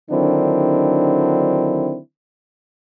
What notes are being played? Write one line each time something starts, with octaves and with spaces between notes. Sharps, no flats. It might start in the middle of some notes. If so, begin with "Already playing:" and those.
D3 D#3 F#3 C4 D4 E4